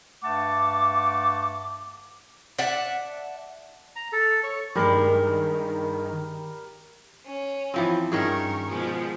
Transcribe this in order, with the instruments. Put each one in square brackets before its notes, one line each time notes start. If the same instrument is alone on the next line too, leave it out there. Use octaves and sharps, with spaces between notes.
[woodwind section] G2 A3 F#5 A5 D6
[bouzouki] D5 E5 F#5 A5
[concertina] A#5
A4
C#5
[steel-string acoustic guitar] G2 G#3 D5 [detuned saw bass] D#3 [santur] G3 A#4
[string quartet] C#4
[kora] E3 F3 C4
[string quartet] G2 A#4 C#6 [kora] D#3 C#4 G#4
[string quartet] B2 F3 G#3